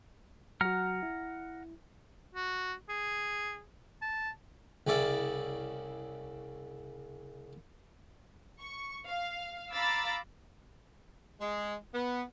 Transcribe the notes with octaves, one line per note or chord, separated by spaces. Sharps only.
F#3 F#4 F#5 A#5 F6
E4
F#4
G#4
A5
C2 C#3 E4 D5
C#6
F5
F5 A#5 B5 D6 E6 A6
G#3
B3